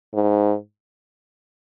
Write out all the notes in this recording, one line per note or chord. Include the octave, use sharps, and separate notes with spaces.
G#2